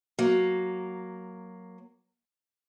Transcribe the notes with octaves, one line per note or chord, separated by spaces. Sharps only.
F#3 A#3